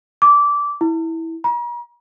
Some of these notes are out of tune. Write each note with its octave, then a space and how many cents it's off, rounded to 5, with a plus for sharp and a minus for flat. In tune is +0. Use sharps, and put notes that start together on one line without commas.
D6 -15
E4 -15
A#5 +45